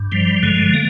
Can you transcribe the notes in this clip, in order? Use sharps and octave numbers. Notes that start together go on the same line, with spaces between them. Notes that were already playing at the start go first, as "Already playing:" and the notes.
Already playing: G2
F3 G3
D3 G#3
A#3